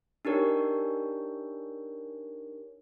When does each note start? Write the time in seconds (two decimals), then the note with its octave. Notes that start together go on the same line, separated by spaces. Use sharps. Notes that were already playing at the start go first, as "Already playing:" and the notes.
0.25 D4 D#4 G4 A#4 C#5